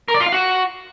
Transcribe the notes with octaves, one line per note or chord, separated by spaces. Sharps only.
A#4
D5
F4
F5
F#4